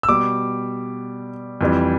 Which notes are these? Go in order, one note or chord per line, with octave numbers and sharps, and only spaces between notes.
E6
B2 G3 D6
F2 E3 G3